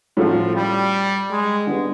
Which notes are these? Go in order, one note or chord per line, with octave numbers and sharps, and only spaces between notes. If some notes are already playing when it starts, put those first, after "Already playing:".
A2 F3 F#3 A3 C#4 F4
G3
G#3
D3 G3 B3